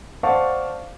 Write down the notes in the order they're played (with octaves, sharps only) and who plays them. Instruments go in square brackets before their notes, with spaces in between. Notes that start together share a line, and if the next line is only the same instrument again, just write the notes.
[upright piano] C5 D5 F5 F#5 A5 C#6